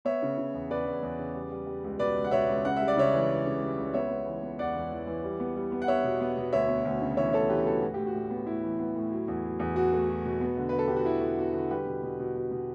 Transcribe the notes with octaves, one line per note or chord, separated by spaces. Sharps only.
B3 C#5 E5
C#3
C#3
E2
E2 B4 D5
E2
E2
C#3
G3
G3
G3
C#2
B2 B4 D5
C#2
F#5
B2 C#5 E5
C#2
C#3 F#5
G3 E5
D5
C#3 C#5 E5
E3
E3
C#3
G3
C#2
B3 C#5 E5
B3
E3
B3
E2 D5 F#5
E2
E3
E3
G3
B3
G3
B3
F#5
B3 C#5 E5
B2
B3
B2
D2 C#5 E5
B3
D2
C#3
E3 C#5 E5
D2 A4 C#5
E3 G4 B4
B3 F#4 A4
A2 F#4
A2 G4
F#4
A2
B3
A2 E4
E3
B3
A2
F#3
E2
F#3
E2
F#3 F#4
A3
F#3
B2
B3
D3
D3 B4
A4
D3 G4
F#4
D3 E4
D3 F#4
B3 F#4
D3 F#4
G3 G4 B4
B2
B2
B2
B2
B2